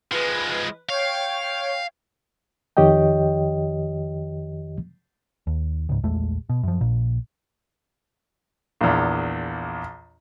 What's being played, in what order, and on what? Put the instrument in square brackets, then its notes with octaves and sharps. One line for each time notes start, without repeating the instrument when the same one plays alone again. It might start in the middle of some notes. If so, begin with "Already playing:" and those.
[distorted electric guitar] F3 G#3 [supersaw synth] B4
[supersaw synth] C#5 G5 [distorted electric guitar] F5
[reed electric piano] F2 D#3 G4 C#5 D#5 G5
[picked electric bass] D#2
C#2 G#2
A#1 E2 G#3 A3
B2
F#2 F3
A#1 A#2
[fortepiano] A#1 E2